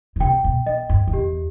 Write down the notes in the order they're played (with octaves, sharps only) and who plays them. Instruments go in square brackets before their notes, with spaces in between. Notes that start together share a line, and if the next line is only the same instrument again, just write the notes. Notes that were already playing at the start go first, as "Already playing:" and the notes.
[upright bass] D#3
[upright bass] C3 [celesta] G5
[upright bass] B2
[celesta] D#5
[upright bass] G2
F#2
[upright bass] E2 [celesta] G4